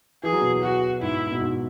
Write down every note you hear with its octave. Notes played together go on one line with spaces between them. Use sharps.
E3 G#4
F#3
B2 E3
F#4
G#2 E4
B2
G#2